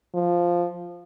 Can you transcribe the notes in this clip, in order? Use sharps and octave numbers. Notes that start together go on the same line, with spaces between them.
F3